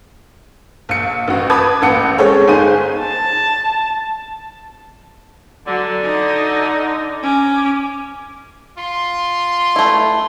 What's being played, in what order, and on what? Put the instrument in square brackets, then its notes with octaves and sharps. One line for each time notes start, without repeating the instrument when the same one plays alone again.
[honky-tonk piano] A#1 C#7
A1 F#4
B4 A5 B5 D6 D#6 G#6
A1 A#3 F#5 C#7
G#3 C4 C#4 A4 C#5
G1 D#4 G#4 C5 D#7
[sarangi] A5
[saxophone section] D3 [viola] F#3
[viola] D#4
C#4 D6
[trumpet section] F4 C6
[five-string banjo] A3 E4